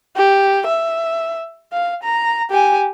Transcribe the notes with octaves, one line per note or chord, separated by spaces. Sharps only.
G4
E5
F5
A#5
G4 G#5